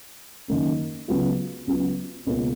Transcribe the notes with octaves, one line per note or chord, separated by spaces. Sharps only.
F#2 D#3 A#3 C#4
C#2 C#3 F#3 B3 F4
C#2 C#3 F#3 B3 F4
C#2 B2 A#3 C#4 F4